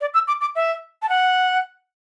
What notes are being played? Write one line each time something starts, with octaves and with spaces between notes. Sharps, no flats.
D5
E6
D6
D6
E5
A5
F#5